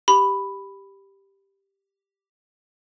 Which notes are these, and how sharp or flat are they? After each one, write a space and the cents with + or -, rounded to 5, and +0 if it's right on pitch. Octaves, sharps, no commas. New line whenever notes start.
G4 +0 B5 +0